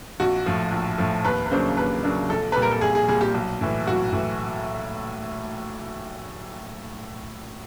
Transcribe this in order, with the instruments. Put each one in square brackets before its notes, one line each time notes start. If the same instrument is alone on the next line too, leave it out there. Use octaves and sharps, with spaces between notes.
[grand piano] A#1 [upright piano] F#4
[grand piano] A2 F3
A#1
A2 F3
[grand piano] D#2 [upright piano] B4
[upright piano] B4
[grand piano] C#3 F#3 A#3 D4 [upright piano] C5
[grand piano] D#2 [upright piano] B4
[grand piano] C#3 F#3 A#3 D4
[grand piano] A#1 [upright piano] A4
[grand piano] A#2 G3 [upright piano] B4
[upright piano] A#4
A4
[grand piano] A#1 [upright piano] G#4
[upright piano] G#4
[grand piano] A#2 G3 [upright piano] G#4
[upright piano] G4
[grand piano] B1
A2 E3
[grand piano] B1 [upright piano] F#4
[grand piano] A2 E3